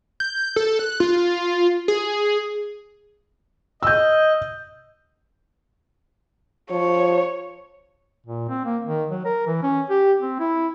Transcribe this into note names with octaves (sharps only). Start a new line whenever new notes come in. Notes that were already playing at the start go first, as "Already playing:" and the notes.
G6
A4
F#6
F4
G#4
D#5 E6 G6
F3 C#5
A#2
C4
A#3
D#3
F#3
A#4
E3
C#4
G4
C4
E4